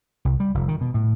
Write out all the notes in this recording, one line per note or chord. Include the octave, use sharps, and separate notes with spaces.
C2
G3
F1
D#3
B2
A2